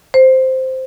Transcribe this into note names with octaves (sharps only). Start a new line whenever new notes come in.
C5